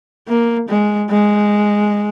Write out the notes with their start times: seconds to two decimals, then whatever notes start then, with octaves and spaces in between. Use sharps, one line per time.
0.28 A#3
0.69 G#3
1.10 G#3